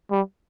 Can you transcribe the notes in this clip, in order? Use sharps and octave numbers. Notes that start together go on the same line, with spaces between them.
G3